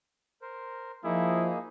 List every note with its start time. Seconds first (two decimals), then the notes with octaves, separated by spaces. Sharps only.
0.42 A#4 C5
1.04 F3 A#3 D#4 E4 G#4